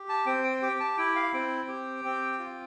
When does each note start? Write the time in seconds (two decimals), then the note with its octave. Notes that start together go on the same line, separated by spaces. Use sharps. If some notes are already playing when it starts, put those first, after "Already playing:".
Already playing: G4
0.09 A5
0.26 C4 G5
0.44 G5
0.62 G4 G5
0.80 A5
0.97 E4 G5
1.16 F5
1.34 C4 G5
1.68 G4
2.05 C4
2.39 F4